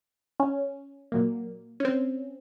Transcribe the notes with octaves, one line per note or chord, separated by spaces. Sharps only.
C#4
A#2 F#3 A#3
C#4
C4